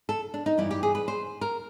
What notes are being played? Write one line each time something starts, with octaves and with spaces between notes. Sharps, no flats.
A4
D4
D#4
G2 E3 G3 E4
G4
G#4
B4
C5
A#4